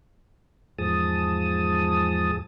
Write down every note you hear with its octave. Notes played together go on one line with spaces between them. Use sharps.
E2 G#2 F3 G#4 A5 D#6